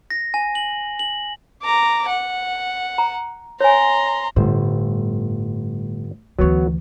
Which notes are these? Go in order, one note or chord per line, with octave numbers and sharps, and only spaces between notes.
A#6
G#5
F#7
F#7
A#5 D6
F#5
A#5
C#5 G#5 A#5 C6
G1 A2 C5
D2 E3 F#3 B3 C#5